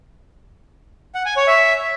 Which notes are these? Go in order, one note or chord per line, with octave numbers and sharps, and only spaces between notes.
F#5
G#5
C#5
E5